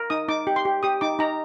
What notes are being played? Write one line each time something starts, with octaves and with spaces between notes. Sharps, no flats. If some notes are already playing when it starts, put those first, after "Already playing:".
Already playing: A#4
D#4 D#6
D#4 D6
G4
C6
G4
G4 D#6
D#4 D6
D#4 A#5